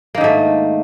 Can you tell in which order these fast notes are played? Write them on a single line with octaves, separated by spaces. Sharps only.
A#3 D#3 G#2 A3